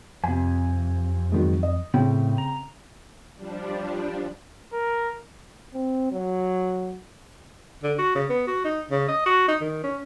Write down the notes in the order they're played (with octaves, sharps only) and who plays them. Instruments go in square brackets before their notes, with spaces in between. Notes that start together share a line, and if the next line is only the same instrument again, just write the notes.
[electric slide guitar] F2 [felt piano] C3 G#5
[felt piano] G#2 D#3 F#3
D#5
[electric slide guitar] A2 [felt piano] C#3 C4 G5
[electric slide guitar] A#5
[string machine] F3 G3 D4
[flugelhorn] A#4
[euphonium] C4
F#3
[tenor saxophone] D3
F#4
C#3
B3
F#4
D#4
C#3
D#5
F#4
D#4
D#3
C#4